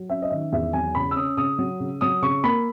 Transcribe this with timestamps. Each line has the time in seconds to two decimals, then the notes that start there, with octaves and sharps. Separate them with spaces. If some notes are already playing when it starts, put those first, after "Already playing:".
Already playing: F#3
0.10 C#4 E5
0.22 D#5
0.31 D#3 E5
0.53 E2 E5
0.73 F#3 G#5
0.95 C#3 B5
1.11 E6
1.16 C#4 D#6
1.37 C#3 D#6
1.59 F#3
1.80 C#3
2.01 F#3 D#6
2.22 C#3 C#6
2.43 A#3 B5